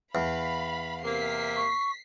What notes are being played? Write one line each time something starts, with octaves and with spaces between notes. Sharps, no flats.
E2 F5 B5
C3 A#3 B6 C7
C#6